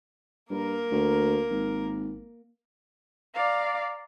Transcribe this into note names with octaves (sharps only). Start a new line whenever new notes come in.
G2 A#3 A#4
D2
G#1
D5 F5 A#5